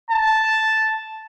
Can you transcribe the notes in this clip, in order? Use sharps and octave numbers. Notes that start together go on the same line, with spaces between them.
A5